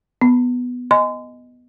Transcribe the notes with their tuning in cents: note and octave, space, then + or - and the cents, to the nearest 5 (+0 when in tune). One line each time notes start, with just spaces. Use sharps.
B3 +0 B5 +0
D#5 +0 G#5 +0 C6 -35